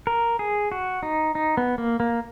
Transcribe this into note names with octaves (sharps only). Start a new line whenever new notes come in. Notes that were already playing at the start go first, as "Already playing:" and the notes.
A#4
G#4
F#4
D#4
D#4
B3
A#3
A#3